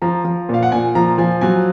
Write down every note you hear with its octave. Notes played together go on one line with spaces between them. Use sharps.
F3 A#5
F3
A#2 F5
F#5
A#2 G#5
F3 A#5
F3 G#5
F#3 G#5